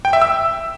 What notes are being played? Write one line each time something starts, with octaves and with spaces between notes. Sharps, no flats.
G5
E5
E6